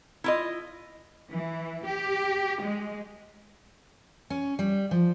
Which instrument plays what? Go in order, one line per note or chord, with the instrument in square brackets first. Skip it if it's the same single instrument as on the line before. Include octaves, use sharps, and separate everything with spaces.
[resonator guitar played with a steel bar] E4 F4 D#5
[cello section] E3
G4
G#3
[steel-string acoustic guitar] C#4
G3
F3